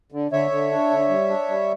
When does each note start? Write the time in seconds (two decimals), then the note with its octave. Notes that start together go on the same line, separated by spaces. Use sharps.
0.12 D3
0.31 D3 C#5 E5
0.51 D3
0.71 D4
0.91 D3
1.09 G3
1.30 D4
1.49 G3